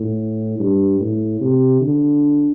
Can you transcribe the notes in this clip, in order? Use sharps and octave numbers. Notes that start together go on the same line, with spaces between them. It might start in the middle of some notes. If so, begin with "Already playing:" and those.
Already playing: A2
G2
A2
C3
D3